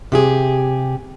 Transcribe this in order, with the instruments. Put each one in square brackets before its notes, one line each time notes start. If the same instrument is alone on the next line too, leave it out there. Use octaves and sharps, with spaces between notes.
[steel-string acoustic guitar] C3 G4 G#4